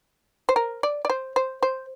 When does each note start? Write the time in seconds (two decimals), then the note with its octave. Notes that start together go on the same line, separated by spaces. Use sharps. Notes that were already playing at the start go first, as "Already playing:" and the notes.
0.49 C5
0.56 A#4
0.83 D5
1.05 D5
1.10 C5
1.36 C5
1.63 C5